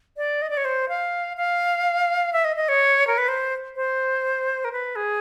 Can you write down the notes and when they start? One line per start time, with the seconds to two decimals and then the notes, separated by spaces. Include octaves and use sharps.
0.17 D5
0.42 D#5
0.50 D5
0.57 C#5
0.65 C5
0.89 F5
1.37 F5
2.33 E5
2.45 D#5
2.56 D#5
2.69 C#5
3.07 A#4
3.18 B4
3.28 C5
3.76 C5
4.65 A#4
4.72 B4
4.96 G#4